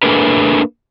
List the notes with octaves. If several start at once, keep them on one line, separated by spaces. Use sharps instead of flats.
A3 A#3 D4 G#4 A#4 B4